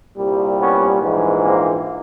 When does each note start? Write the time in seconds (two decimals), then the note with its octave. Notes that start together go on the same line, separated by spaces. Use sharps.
0.16 C2 A#2 G3
0.58 B3 C#4
1.01 A#1 G#2 E3
1.43 A#3 C4